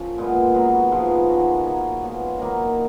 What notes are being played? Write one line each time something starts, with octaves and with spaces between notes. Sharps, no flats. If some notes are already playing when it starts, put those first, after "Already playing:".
Already playing: F#2 F3 C#4
A#2 G#3 B3
G#2 F#3 B3 F#4
G#2 F3 B3
D#3 G#3 C#4 F#4
C#3 F#3 A#3 C#4
A#2 G#3 B3 F4
D#3 F#3 A#3 D#4